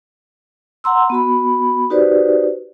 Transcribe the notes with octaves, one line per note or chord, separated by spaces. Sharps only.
F#5 A#5 C6 E6
B3 F#4 B5
D#4 F#4 G4 B4 C5 D5